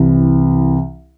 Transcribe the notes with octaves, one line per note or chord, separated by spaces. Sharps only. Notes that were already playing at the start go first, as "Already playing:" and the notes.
Already playing: C2 C3 E3